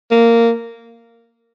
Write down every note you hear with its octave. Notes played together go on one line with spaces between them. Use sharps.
A#3